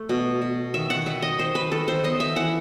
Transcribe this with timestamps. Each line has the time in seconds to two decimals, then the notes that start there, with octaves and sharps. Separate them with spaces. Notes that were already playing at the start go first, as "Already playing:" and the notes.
Already playing: A3
0.09 B2
0.42 B2
0.74 D#3 E5
0.90 F#5
1.06 D#3 E5
1.22 D#5
1.39 D#3 C5
1.55 B4
1.72 D#3 A4
1.88 C5
2.04 B3 D#5
2.20 E5
2.36 E3 F#5